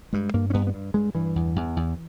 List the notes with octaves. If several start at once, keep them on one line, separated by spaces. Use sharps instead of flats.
G2 G#3
G2 A#3
C#4
G2 B3
B3
G2
G2 G#3
G2 E3
E2
E2
E2